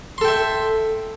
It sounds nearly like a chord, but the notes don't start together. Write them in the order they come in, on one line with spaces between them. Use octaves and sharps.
C6 A4 G5 E5